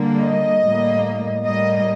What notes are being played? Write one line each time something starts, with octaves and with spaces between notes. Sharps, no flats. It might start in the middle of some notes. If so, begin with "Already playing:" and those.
Already playing: D3 G3 A#3
D#5
A2 G3 A#3
A2 G3 A#3 D#5